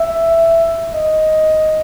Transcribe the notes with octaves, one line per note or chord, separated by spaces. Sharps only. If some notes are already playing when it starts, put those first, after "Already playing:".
Already playing: E5
D#5